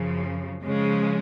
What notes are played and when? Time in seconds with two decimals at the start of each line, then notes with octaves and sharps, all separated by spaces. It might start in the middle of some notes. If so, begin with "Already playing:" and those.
Already playing: F#2 C#3 F3
0.64 C#3 F3 G#3